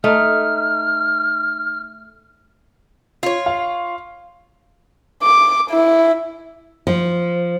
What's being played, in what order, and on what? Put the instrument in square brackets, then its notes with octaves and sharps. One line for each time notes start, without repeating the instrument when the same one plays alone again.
[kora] A3 D#4 [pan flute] F6
[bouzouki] F4 C#5
[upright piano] F5
[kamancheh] D6
E4
[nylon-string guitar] F3